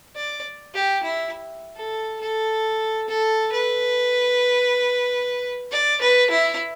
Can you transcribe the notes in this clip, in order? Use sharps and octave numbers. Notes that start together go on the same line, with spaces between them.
D5
G4
E4
A4
A4
A4
B4
D5
B4
E4